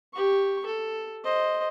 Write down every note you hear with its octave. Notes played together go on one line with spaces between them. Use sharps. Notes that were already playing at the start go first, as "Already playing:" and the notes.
G4 C#6
A4
C5 D#5